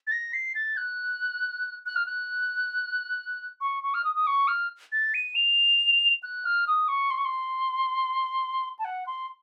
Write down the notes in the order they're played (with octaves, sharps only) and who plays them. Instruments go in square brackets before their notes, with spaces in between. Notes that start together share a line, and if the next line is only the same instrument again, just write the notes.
[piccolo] A6
A#6
C7
A6
F#6
F#6
F6
F#6
C#6
C#6
F6
D#6
D#6
C#6
F6
A6
D#7
F7
F#6
F6
D#6
C#6
C6
C#6
C6
A5
F#5
C6